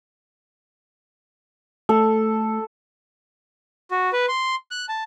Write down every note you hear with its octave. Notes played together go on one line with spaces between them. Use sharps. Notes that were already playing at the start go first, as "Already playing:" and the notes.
A3 A4
F#4
B4
C6
F#6
A5